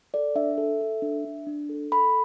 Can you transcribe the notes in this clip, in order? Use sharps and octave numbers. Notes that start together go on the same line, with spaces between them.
A4 D5
D4 E5
A4
A4
D4
D4
D4
A4
A4 B5